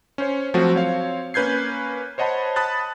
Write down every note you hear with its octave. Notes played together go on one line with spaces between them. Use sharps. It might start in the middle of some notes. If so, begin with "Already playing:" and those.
C#4 C5 C#5
F3 F#3 A3 C4 F#4
C4 C#5 F5
A#3 C#4 B4 G6 G#6 C7
C5 C#5 D#5 F#5 A5 B5
A5 B5 D#6 F#6 A6